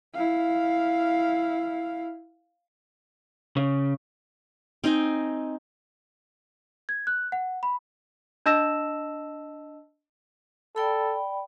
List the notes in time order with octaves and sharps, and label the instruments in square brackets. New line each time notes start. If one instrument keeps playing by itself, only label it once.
[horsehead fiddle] E4 F5
[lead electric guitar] C#3
[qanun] C4 D#4 D#5 G#5
[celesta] G#6
F#6
F#5
B5
D4 D#5 A5 E6 A#6 E7
[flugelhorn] A4 [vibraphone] D5 G5 B5